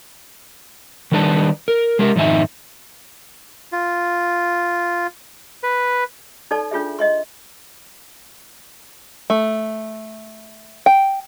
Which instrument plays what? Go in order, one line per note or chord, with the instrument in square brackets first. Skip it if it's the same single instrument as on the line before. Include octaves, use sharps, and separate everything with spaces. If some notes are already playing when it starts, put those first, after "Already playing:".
[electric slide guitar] D#3 G3 D4 B4 A5
A#4
G#3 G4 A#4
F2 G#2 D#3 D#4 E5 G#5
[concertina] F4
B4
[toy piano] D#4 A4 D5 A5
D4 F4 G#4 E5
D#5 E5 C6
[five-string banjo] A3
G5